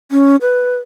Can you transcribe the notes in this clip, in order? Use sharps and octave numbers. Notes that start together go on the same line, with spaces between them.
C#4
B4